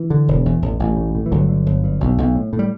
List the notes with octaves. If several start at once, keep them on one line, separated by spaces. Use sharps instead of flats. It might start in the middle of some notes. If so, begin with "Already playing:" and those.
Already playing: E3
D3
E1
E2
A1
A1
A2
A2
E3
G1 D3 F#3
D3
G1
G2
B1
B1
A2
A2
G3